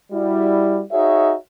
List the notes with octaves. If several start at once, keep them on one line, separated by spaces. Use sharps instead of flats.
G3 E4 F#4
D#4 F#4 G#4 C#5 E5